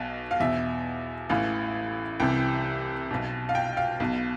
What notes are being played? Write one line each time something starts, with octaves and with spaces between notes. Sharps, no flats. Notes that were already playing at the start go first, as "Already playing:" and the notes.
Already playing: B1 B2
F5
E2 B2 E5
A1 A2 E3 F5
C2 C3 E3 G5
B1 B2
F5
G5
F5
B1 B2